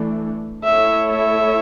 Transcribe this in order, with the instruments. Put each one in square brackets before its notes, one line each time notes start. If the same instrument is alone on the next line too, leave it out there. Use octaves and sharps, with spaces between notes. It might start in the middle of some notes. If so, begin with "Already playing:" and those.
Already playing: [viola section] E3 A3 D4
[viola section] A3 E4 A4 C#5 [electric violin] E5
[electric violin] E5